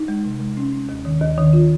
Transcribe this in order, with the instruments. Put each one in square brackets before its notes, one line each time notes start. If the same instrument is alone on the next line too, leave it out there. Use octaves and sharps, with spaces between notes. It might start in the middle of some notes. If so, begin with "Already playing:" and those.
Already playing: [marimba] D#4
G#3
C3
G#3
C#4
C#4
D#2
D#3
D#2
D#3
F4